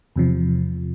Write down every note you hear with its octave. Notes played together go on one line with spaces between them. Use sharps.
E2 C3 F3